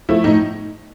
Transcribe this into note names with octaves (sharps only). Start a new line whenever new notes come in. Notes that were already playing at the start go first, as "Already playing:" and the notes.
F3 A3 E4
A2 D#4